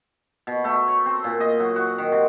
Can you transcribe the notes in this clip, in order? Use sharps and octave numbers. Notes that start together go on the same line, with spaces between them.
B2
A3
C#5
C4
A#2
D#5
F#3
F#4
D#3
C3